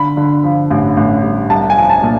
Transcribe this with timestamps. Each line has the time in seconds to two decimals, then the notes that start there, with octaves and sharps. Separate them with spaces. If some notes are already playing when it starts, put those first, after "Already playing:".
Already playing: D3 B5
0.17 D3
0.44 F3
0.70 A1
0.97 A1
1.23 G2
1.50 C2 A5
1.70 G#5
1.76 F3
1.90 A5
2.03 A#2